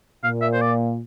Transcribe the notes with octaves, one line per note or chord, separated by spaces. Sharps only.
A#2 F5
E5
C5
D5